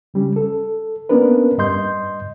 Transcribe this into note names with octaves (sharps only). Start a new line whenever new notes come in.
C#3 G3 C#4
A4
A#3 B3 C#4 D4 A#4 B4
G2 D#5 C6 G6